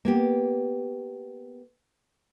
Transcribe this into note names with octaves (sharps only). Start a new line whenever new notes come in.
A#3 B3 G4